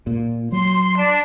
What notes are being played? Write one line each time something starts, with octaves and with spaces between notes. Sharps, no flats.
A#2
F#3 C6
D4